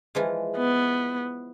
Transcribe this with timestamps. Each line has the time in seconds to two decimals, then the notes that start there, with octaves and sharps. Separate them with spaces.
0.15 E3 F3 G#3
0.57 B3